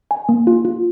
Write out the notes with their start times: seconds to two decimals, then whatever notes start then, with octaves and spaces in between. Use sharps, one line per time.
0.11 G#5
0.29 A#3
0.47 F4
0.65 F4